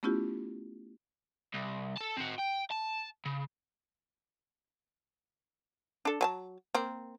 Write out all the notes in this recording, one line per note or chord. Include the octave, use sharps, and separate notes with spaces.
A3 B3 C#4 E4 F4 G4
C2
A4 A5
C4 F#4
G5
A5
C#3
D4 A4
F#3 G#5 A5
A#3 C4